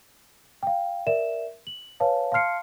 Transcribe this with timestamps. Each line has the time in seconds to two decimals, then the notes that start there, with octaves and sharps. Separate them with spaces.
0.63 F5 G5
1.07 A#4 D5 E5 E7
1.67 F#7
2.00 B4 C#5 F5 G#5 A5
2.32 F5 A5 C6 F6 C7 C#7